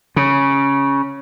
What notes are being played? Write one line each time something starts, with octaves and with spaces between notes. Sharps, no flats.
C#3